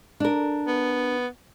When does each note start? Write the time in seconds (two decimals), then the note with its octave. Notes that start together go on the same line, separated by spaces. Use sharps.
0.20 D4 A#4
0.67 B3